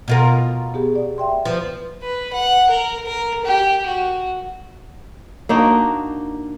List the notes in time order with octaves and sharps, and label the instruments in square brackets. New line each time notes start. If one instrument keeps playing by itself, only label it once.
[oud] B2 F4 A#4
[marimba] B3 G4 G#4
D5
E5 G5 C6
[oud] F3 [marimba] B4
[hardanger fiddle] B4
F#5
A#4
A#4
G4
F#4
[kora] A#3 D4 D#4 F#4